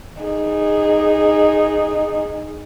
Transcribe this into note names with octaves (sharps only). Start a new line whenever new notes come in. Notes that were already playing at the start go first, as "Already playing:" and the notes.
D#4 G#4